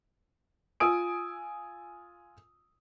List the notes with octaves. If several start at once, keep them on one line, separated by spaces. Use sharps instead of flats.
F4 G#5 D#6 E6 D7